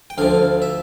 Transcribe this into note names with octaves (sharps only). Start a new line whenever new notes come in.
G5
D2 D3 F3 F5
E5